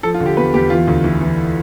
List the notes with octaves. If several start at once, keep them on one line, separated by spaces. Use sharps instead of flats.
F3 A4
F4
D3
G4
E2 B4
E2 G4
E3 F4
D2
E3
E3